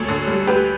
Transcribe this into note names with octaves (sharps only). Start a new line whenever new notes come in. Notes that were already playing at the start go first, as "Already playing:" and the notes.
Already playing: D2 A4 C#5
D3
G3
D2 G4 B4